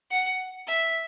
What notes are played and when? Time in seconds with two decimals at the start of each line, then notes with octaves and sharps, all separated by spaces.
0.11 F#5
0.67 E5